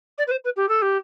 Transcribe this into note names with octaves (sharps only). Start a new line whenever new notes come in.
D5
B4
C5
B4
G4
A4
G4